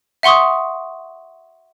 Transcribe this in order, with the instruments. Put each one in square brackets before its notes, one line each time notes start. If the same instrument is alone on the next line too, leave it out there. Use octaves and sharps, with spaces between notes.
[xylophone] E5 F#5 C6 C#6 D#6